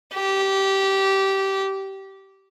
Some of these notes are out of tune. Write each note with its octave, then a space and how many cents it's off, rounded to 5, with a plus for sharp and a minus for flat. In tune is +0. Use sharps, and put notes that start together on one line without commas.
G4 -15